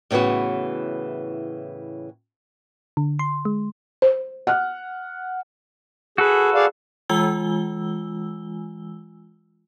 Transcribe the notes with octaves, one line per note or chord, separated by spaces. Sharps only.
A2 C#3 E3 B3 F#4
D3
C6
G#3
C5
F#5 F6 F#6
F#4 G#4 A4 B4
G#4 D5 F5
E3 G#3 F4 G#5 E6 G7